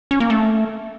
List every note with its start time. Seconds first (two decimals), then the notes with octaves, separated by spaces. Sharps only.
0.11 C#4
0.20 A#3
0.30 A3